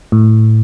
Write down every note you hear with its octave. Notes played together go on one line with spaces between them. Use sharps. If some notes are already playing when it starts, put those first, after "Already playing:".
A2